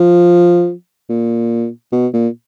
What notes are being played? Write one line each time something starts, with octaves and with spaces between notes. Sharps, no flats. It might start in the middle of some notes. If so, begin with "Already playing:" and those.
Already playing: F3
A#2
B2
A#2